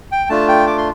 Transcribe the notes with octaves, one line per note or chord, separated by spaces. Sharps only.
G5
A3 D4 F4 A5
G5
D6
C6